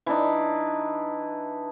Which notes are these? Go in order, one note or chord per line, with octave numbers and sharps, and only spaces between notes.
E3 D4 D#4